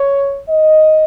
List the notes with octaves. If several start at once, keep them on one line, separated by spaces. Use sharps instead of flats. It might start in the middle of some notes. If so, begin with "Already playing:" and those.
Already playing: C#5
D#5